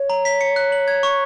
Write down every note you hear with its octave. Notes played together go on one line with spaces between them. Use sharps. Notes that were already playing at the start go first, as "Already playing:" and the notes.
Already playing: C#5
A#5
B6
C#7
F#6
F#7
G#6
C#6